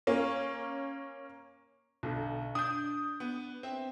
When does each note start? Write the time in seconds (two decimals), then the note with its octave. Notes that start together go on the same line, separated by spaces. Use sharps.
0.07 A#3 C#4
2.03 B1 B2 D3
2.55 D4 D#6 G6
3.20 B3
3.63 C4 E5